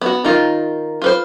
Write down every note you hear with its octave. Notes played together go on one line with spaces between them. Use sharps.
B3 F#4
D#3 D#4 F4
F4 B4 C5